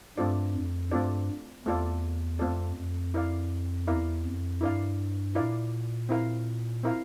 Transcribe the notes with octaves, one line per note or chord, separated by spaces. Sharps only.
G2 A3 C4 F4 A4 D5
F2
G2 A3 C4 F4 A4 D5
E2 A3 C4 F4 A4 D5
F2 A3 C4 F4 A4 D5
F2
E4 A#4 D5 F5
E2 E4 A#4 D5 F5
F2
G2 E4 A#4 D5 F5
A#2 E4 A#4 D5 F5
C4 E4 A#4 F5
C4 E4 A#4 F5